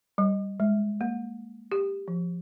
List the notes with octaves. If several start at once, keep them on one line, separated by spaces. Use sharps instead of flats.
G3
G#3
A#3
G4
F3